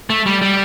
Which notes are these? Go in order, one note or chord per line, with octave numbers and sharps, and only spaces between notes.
A3
G3
G3